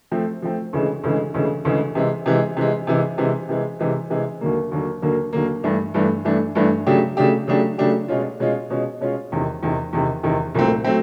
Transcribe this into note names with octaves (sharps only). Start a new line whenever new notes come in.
F3 A3 C4
F3 A3 C4
D2 C#3 E3 G#3
D2 C#3 E3 G#3
D2 C#3 E3 G#3
D2 C#3 E3 G#3
C3 E3 G#3
C3 E3 G#3
C3 E3 G#3
C3 E3 G#3
C3 E3 G#3
C3 E3 G#3
C3 E3 G#3
C3 E3 G#3
D#2 D3 F#3 A#3
D#2 D3 F#3 A#3
D#2 D3 F#3 A#3
D#2 D3 F#3 A#3
G2 E3 A3 D4
G2 E3 A3 D4
G2 E3 A3 D4
G2 E3 A3 D4
C#3 F#3 A3 D4 G4
C#3 F#3 A3 D4 G4
C#3 F#3 A3 D4 G4
C#3 F#3 A3 D4 G4
B2 G#3 C#4 F4
B2 G#3 C#4 F4
B2 G#3 C#4 F4
B2 G#3 C#4 F4
E2 C3 D#3
E2 C3 D#3
E2 C3 D#3
E2 C3 D#3
C2 A#2 F#3 A3 C4
F#3 A3 C4